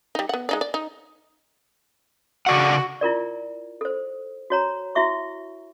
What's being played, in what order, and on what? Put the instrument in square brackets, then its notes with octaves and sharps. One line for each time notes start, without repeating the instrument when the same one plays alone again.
[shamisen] G3 D#4
B3 F#5
G#3 D#4 D5
D5
D#4
[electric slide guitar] C#3 D5 F#5 [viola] F#4
[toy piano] E4 F4 A#4 D5
A4 C5
F#4 C#5 A#5
E4 F#4 E5 C#6